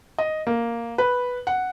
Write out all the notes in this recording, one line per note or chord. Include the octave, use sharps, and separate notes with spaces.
D#5
A#3
B4
F#5